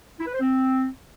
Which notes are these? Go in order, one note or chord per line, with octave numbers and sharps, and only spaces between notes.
E4
B4
C5
C4